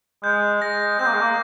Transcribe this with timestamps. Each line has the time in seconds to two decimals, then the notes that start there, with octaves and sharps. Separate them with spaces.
0.23 G#3 G6
0.62 G#3 A#6
0.99 C4 G6
1.07 A#3
1.13 G#3
1.21 A#3